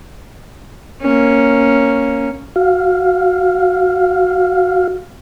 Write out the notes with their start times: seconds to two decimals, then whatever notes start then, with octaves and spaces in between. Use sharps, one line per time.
1.02 A#3 C#4
2.56 F#4 F5